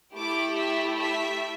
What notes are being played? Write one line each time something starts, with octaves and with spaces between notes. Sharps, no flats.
A3 E4 G4 D6
E5
E5